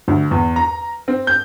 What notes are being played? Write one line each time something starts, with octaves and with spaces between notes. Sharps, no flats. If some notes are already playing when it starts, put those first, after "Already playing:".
D2
E2
A#5
C4
G6